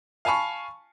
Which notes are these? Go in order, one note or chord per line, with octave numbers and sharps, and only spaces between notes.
F5 G#5 A5 B5 C#6